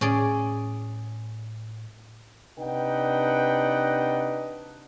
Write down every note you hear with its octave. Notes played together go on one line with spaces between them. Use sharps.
A2 C#4 G#4 D5
C3 D4 D#4 B4 F#5 G5